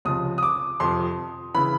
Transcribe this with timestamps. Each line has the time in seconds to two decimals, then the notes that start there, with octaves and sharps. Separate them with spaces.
0.05 C#2 C3 F3 D#6
0.38 D#6
0.43 D6
0.80 F2 C3 F3 C6
1.55 C#3 E3 B5